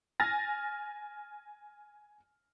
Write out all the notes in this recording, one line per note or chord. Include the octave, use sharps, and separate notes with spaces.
G#5 F6 A6 A#6